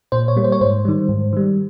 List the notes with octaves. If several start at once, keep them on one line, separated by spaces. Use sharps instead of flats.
A#2 C5
C#5
G3 A#3
C5
C#5
G#2 C5
D#3 G3
G#2
D#3 G3